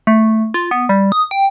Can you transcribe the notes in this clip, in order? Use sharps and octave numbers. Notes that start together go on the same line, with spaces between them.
A3
F4
B3
G3
D#6
G5